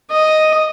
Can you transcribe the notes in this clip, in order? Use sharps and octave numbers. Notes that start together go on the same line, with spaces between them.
D#5